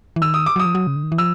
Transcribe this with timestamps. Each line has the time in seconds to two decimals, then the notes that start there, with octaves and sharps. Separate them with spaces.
0.16 E3
0.22 D#3 E6
0.34 D#6
0.46 D6
0.56 F#3 D#6
0.65 F3
0.75 F#3
0.87 C#3
0.96 D3
1.03 D#3
1.12 E3
1.18 F3 E6